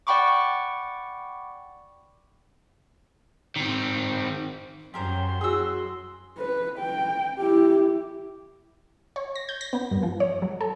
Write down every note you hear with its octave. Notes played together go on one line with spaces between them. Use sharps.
D5 F#5 G5 B5 C#6 D6
D#3 C4
F#2 G4 A#4 C5 C6
F#4 G#4 D#6 E6
B4
G5
E4 G4
C#5
A#6
G6
A#6
B3
G2
F3
C#5
F#3
A4